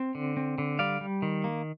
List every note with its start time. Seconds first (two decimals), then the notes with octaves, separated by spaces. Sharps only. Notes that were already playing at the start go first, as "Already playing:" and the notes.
Already playing: C4
0.15 D3
0.37 C4
0.58 D3
0.79 G3 D5 F5
1.01 G3
1.22 D#3
1.44 A#3